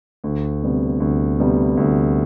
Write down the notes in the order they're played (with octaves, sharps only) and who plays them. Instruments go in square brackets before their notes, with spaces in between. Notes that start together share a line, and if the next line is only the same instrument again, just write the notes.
[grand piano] D2
C3 G3 B3
D2
C3 G3 B3
D2